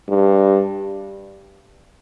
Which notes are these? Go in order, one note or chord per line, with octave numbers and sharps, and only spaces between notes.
G2